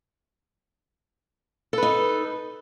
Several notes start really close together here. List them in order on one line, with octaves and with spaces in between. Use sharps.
A4 B4 D#4